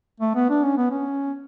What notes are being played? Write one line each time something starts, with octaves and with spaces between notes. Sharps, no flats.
A3
B3
D4
C#4
B3
C#4